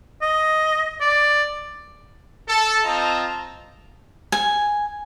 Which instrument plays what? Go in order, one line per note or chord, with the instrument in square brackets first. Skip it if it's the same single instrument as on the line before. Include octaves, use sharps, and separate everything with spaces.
[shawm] D#5
D5
[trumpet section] A4
C4 F4 D#5 A5 A#5
[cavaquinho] G#5